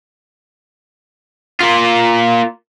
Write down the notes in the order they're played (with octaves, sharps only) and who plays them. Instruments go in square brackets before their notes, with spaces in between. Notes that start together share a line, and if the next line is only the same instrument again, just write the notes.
[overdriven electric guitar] A#3 F4